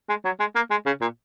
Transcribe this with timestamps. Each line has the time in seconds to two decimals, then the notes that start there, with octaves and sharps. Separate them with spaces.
0.09 G#3
0.25 F#3
0.40 G#3
0.55 A#3
0.71 G#3
0.86 C#3
1.01 A#2